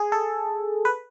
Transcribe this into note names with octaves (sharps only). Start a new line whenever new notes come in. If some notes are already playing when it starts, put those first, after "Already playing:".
Already playing: G#4
A4
B4